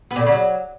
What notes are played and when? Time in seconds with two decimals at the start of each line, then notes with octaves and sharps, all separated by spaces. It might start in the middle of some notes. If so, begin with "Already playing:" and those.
0.11 B3
0.16 A#2
0.21 D3
0.26 C#3
0.32 F#3